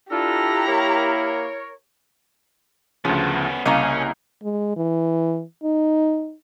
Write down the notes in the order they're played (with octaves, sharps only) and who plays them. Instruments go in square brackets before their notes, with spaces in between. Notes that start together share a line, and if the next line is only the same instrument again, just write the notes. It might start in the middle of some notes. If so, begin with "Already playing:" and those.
[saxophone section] D4 F4 [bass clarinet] E4 [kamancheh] G4 A#5 [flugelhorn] A4
[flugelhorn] A#3 [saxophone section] A#4 C#5
[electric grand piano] D2 C#3 [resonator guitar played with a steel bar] F3 [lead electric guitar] B3 C#4
[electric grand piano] C2 A#5 [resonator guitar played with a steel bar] C#3 A#3 D#5 [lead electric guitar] C#4
[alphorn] G#3
E3
D#4